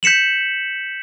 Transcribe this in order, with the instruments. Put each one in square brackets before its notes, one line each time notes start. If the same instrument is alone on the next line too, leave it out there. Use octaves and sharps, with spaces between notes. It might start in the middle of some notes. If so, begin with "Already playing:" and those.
[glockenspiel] G6 B6 C#7 E7 F#7